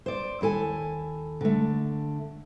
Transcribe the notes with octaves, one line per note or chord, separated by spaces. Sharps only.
C5 D5
D#2 E4 A4 G#5
D3 A3